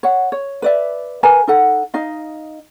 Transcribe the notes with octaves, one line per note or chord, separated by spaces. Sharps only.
C#5 F#5
C#5
B4 D5 E5
A#4 B4 G#5 A#5
D#4 A4 F#5
D#4 D#5 F5